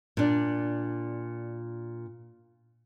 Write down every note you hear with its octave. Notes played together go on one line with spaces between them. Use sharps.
A#2 D4